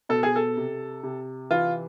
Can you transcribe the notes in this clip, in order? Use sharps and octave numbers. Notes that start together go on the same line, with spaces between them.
B2 A4
G#4
A4
C3
C3
E3 F4